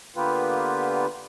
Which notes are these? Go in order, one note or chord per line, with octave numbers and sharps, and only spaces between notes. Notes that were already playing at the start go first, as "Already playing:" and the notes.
D3 A#3 B3 F4 G4 B4